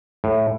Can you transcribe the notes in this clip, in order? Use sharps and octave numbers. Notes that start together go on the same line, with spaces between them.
A2